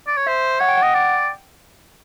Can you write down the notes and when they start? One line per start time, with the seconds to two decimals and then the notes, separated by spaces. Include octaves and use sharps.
0.07 D5
0.17 C#5
0.27 C5 E5
0.60 C#5 F#5
0.69 G5
0.77 F#5
0.82 D#5
0.94 D5 G5